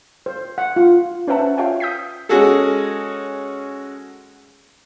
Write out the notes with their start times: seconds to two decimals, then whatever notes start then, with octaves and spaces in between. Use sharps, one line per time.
0.26 C5
0.58 F#5
0.76 F4
1.28 C#4 B4 C5 E5 F#5 A5
1.58 F4 C#5 E5 F5 G5
1.80 D#6 G6 B6
2.29 G#3 C#4 F#4 G#4 A4